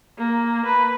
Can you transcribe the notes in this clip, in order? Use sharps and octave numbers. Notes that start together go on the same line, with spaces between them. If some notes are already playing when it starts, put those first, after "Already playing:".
A#3
B4